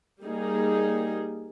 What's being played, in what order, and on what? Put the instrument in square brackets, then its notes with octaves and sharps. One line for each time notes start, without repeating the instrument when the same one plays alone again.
[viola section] G3 A#3 D#4 G#4